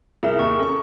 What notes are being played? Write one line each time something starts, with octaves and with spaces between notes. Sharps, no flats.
C2 E4 G#4 A#4 E7
D#2 A#4 C#6
C#4 A4 C#6